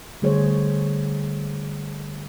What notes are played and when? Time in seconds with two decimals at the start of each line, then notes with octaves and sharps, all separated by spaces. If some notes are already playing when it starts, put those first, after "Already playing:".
0.22 D3 G3 A3 G#4 C5 C#5